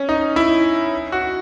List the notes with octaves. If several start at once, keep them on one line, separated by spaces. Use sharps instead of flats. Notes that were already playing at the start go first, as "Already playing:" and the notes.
Already playing: C#4
D#4
E4
F#4